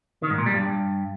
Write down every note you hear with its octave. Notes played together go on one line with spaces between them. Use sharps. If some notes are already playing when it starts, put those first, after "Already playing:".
D#3
G#2
A#2
G3
G2